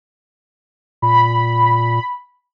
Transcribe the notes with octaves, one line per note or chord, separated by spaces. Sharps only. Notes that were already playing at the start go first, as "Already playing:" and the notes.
A#2 B5